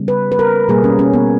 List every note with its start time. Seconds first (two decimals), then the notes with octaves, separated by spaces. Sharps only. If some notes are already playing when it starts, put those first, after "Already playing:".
Already playing: C#3 G3 B3
0.08 B4
0.32 B4
0.39 A#4
0.68 B2 G3 A#3 G#4
0.84 C#4
0.99 C#4
1.14 B3